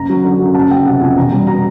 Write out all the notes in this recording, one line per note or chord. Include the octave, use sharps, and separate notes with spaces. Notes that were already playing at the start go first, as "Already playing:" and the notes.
Already playing: F#1 A#5
F#3
D3
F#2
F#1 A5
F#1 G5
C3 F#5
F2 G#5
E1 A#5
G3
B2 A#5